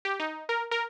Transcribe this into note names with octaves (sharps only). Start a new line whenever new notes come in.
G4
D#4
A#4
A#4